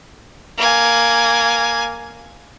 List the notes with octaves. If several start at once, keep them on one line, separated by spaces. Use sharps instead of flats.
A#3 G#5